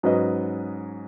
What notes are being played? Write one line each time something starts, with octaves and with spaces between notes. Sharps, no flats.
G#2 F#3 C#4 B4 D#5